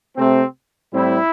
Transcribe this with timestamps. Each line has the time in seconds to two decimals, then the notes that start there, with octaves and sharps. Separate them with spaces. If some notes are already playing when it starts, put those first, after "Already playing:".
0.16 C3 A3 C4
0.92 A2 G3 C4 E4